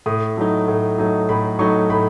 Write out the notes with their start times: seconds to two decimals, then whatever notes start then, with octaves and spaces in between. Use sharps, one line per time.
0.06 A2 D#6
0.37 F#3 A3 D#4
0.68 A2
0.98 F#3 A3 D#4
1.29 A2 B5
1.59 F#3 A3 D#4 C#6
1.90 A2 B5